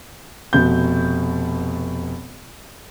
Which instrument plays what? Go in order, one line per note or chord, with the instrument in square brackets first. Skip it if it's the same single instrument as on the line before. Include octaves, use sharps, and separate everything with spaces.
[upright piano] F1 B2 G6